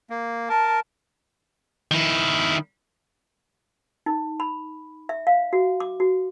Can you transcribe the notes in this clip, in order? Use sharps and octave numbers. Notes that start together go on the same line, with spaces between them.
A#3
A#4 A5
D#3 E4
D#4
B5
E5
F5
F#4
D6
F#4